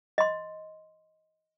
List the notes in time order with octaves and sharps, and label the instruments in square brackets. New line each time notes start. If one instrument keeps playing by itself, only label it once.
[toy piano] D#5 C6